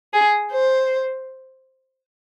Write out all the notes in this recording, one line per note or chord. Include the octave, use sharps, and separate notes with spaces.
G#4
C5